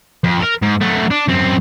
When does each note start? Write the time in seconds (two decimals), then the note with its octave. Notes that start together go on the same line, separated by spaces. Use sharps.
0.24 F2
0.40 A4 A#4
0.62 G#2
0.81 F#3 A3
1.11 D4
1.28 F#2 C4